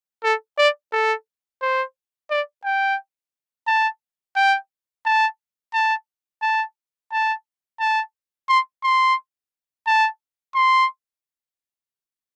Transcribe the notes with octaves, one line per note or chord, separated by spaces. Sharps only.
A4
D5
A4
C5
D5
G5
A5
G5
A5
A5
A5
A5
A5
C6
C6
A5
C6